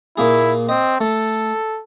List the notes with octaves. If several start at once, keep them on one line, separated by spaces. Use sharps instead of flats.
A#2 A#3 E4 G#4
C4 D#5
A3 A4